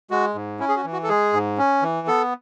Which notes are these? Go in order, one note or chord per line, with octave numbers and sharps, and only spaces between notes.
G#3 F#4
G#2
C#4 E4
G#4
F#4
E3
F#4
A4
G#3 G#4
G#2
C#4
E3
B3 A4